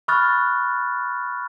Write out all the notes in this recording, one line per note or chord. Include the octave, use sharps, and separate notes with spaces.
B5 C#6 D#6 F6 F#6 A6